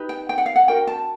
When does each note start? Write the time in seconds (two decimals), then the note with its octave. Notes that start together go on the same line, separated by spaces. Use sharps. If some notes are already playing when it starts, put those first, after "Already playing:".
Already playing: D#4 G4 B4
0.09 G5
0.29 G5
0.38 F#5
0.46 F5
0.56 F#5
0.68 D4 F#4 A#4 G5
0.87 A5